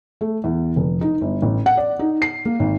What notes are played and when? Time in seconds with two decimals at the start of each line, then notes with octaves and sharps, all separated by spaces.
0.21 A3
0.44 E2
0.76 F1
1.01 D#4
1.21 G1
1.42 A1
1.66 F#5
1.77 D5
1.99 D#4
2.22 C7
2.45 A#3
2.59 G#1